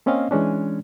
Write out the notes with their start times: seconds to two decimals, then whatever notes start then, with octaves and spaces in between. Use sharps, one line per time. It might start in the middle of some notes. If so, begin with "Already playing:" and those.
0.06 A#3 C4 C#4 D#5 F5
0.31 E3 G#3 C#4 D4